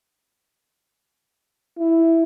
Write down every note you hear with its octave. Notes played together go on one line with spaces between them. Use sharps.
E4